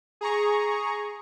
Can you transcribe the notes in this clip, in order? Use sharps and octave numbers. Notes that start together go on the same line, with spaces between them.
G#4 A#5 C#6